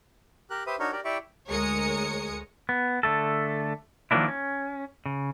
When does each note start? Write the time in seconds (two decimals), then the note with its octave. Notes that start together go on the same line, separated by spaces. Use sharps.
0.50 G4 A#4 F#6
0.67 G4 B4 C5 E5 D#6
0.79 D4 D#4 F#4 A#4 C#5
0.92 G4 A#4 D5
1.05 E4 G4 D5 E5 G5 C#6
1.49 D2 G#3 A#4 C#5 D#6 C#7
2.69 B3
3.03 D3 A3 A4
4.11 D#3 F3 F#3 A#3 D4 E4
4.28 C#4
5.06 C#3